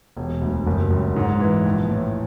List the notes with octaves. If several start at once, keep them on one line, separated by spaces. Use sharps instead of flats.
E1
D2
F#1
F#2
G#2
E3
A#1
A2